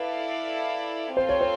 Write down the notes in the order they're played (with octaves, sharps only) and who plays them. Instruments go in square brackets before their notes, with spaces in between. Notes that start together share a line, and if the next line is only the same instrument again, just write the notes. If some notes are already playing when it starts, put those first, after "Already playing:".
Already playing: [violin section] E4 A4 D5 F5 [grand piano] B4
[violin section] C4 F4 A4 [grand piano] C5
[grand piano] C#5
C5